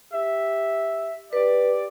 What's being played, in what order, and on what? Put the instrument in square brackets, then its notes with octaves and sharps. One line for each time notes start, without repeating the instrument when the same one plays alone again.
[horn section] G4 E5
[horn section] G4 D5 [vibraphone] B4